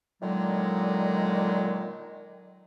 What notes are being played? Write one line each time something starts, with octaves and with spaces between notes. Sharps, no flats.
A#2 D3 D#3 F#3 G#3